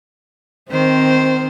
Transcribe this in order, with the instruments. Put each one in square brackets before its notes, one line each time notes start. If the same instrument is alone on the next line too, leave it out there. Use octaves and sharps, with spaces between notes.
[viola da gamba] D#3 C5 [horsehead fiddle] C4